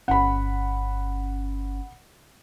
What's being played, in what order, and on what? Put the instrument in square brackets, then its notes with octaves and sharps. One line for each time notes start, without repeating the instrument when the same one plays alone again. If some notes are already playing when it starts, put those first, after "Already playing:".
[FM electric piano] G1 C#4 [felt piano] F#5 B5